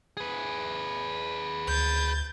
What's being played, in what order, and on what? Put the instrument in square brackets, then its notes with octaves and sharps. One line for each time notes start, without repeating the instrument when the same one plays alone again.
[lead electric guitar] G#4 B4
[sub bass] D2 [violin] G6 A6